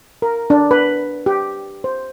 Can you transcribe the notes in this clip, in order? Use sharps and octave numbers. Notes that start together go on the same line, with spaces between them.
A#4
D4
B4
G4
C5